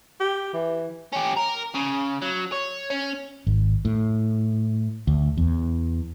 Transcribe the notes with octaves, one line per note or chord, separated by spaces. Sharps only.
G4
E3
C#4 G4
A#4
C#3
F#3
C#5
C#4
G#1
A2
D2
E2